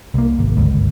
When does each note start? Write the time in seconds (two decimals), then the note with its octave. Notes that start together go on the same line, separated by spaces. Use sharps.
0.14 C2 A#3
0.39 G#1
0.57 G1 C#2